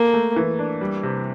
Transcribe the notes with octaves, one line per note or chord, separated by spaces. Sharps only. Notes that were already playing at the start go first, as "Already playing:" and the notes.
Already playing: A#3 A4
A3
E3
D4
G3
C3